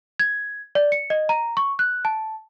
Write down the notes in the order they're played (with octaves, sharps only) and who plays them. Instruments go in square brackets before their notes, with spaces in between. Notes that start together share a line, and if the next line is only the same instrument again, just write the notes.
[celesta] G#6
D5
C#7
D#5
A#5
C#6
F#6
A5